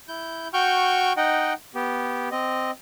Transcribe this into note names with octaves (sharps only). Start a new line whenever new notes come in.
E4 G6
F#4 G5 C#6 F6 G6
D#4 D#5 F#5 G5
B3 G4
C4 D#5